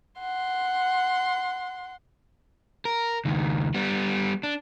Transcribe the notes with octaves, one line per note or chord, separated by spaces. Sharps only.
F#5 C6
A#4
C#2 D#3
G3 B3
D4